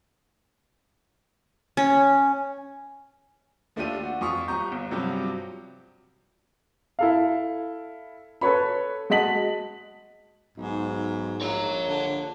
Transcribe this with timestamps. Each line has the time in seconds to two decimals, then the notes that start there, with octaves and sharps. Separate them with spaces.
1.77 C#4
3.76 D#2 A3 D4 F4 G4 D#7
4.03 F#4
4.21 F2 F4 C#6 D#6
4.48 D#1 A#5 C#6 G6
4.72 G1
4.91 G2 C3 F3 F#3 G4
6.99 E4 A4 F5
8.41 A4 B4 C#5 B5
9.10 G#3 F#4 D#5 A5 B6 F#7
10.57 B1 G#2
11.41 A#1 C#5 A#5
11.89 D3